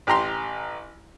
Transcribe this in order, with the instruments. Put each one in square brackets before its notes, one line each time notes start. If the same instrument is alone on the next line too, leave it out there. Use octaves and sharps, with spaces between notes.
[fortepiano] A1 G4 A#5 C6